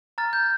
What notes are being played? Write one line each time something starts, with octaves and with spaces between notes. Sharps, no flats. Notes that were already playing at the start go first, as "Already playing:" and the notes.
A#5 F6 A6
G6